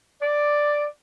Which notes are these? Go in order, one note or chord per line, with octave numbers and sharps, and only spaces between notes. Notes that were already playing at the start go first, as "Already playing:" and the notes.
D5